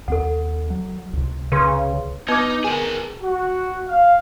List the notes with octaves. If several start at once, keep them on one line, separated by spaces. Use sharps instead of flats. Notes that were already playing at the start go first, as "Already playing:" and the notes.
D#2 C4 A4 F#5
F#3
C#2 C3
C#3 B4 C6
B3 D#4 B4 D6
G#4 A#4 G#5
F#4
F5